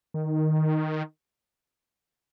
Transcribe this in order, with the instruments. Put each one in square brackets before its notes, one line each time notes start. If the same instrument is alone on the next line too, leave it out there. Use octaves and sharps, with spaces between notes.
[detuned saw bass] D#3